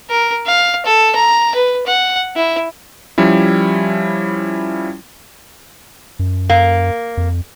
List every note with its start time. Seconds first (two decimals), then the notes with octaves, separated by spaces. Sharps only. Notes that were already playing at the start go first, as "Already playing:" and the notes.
0.10 A#4
0.46 F5
0.86 A4
1.15 A#5
1.55 B4
1.87 F#5
2.36 E4
3.18 F3 G3 C#4 E4
6.19 F#2
6.50 F#2 A#3
7.17 F2